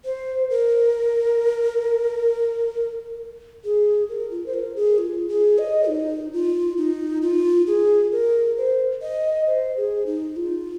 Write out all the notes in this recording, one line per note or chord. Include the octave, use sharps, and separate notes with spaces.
C5
A#4
G#4
A#4
F4
C5
A#4
G#4
F4
G#4
D#5
D#4
F4
D#4
F4
G#4
A#4
C5
D#5
C5
G#4
D#4
F4